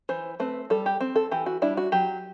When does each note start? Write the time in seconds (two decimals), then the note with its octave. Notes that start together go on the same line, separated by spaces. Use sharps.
0.09 E3 C5
0.40 A3 C4 B4
0.70 G3 A4
0.86 G4
1.01 C4
1.16 A4
1.31 E3 G4
1.46 F#4
1.62 G3 D4 E4
1.77 F#4
1.92 F#3 G4